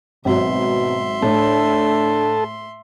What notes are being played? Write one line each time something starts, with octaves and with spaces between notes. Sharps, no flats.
G#1 B2 F#3 E5 C6
A2 D4 A4